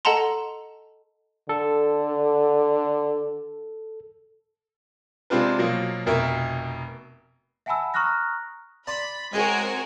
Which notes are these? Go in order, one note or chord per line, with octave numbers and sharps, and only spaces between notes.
A4 D#5 F#5 A5 A#5 C6
D3 A4
C3 G#3 C4 D4 F4 B4
B2 F3 F#3 A#3
F1 B2 A#4 E5
E5 F#5 G#5 A5 B5 E6
A#5 C#6 D#6 F6 F#6 A#6
D5 A5 B5 C6
G#3 C4 F#4 G#4 A#4 C#5 D#5 G#5